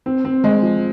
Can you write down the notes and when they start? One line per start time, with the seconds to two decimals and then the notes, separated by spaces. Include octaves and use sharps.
0.06 C4
0.25 C4
0.44 G#3
0.62 F3